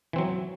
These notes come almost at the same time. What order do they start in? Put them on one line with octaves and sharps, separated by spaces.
E3 C4 F#3